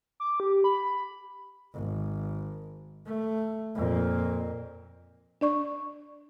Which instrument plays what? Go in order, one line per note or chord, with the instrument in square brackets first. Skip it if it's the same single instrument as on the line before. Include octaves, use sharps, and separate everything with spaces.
[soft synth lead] D6
G4
B5
[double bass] G#1
A3
F2 A#2
[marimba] D4 D5 C#6